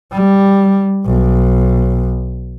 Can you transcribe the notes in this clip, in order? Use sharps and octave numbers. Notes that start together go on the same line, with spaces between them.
G3
B1